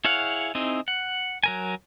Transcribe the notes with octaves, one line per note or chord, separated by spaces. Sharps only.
E4 G#4 C#5 F5 F#5
C4 D#4 E4 G#4
F#5
F#3 A#4 G#5